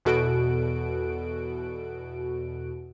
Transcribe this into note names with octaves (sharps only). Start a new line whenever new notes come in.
E2 B2 F#4 A4 F#6 D7